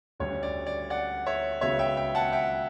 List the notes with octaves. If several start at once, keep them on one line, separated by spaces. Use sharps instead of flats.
D2 D3 G3 C#4 C#5
D5
D5
D5 F#5
C#5 E5
C#2 C#3 F#3 B3 C#5 E5
E5 G5
E5 G5
F#5 A5
E5 G5